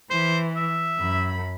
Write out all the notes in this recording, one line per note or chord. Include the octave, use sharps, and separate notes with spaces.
E3 C5
E5
F#2 B5